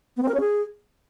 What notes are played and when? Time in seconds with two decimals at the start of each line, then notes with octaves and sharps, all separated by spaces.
0.17 B3
0.23 C4
0.28 A#4
0.34 C#4
0.40 G#4